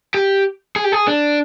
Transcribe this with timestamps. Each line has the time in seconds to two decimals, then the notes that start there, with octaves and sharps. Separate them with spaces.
0.14 G4
0.76 G#4
0.84 G4
0.92 G#4
1.08 D4